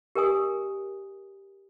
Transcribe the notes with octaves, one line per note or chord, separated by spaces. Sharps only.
G4 A#4 D#5 G#5 D#6